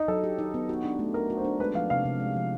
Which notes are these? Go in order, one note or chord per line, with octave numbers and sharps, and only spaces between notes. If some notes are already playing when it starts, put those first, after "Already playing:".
Already playing: D#4
F#3 A4
G4
D#4
B3
F#4
D4
A3
A4 A#4
F#4
C5
D4
G#3 B4
F3 F5
C3 F5
C3
G#3
F3